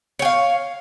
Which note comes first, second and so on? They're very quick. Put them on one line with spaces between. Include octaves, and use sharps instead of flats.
C#5 G5 F5